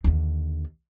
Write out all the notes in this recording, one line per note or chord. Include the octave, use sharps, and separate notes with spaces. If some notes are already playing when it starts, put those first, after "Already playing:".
D#2 D3